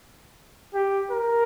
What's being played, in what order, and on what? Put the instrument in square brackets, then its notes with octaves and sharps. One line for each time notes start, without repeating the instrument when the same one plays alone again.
[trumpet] G4
A#4